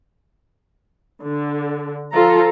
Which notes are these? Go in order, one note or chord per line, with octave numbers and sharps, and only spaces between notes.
D3
F3 F4 A4 A#5